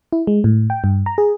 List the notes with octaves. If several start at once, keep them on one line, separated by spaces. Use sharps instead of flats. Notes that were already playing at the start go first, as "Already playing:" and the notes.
E4
G#3
A2
G5
G2
A#5
G#4